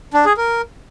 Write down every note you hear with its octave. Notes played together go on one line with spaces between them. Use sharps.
D4
G#4
A#4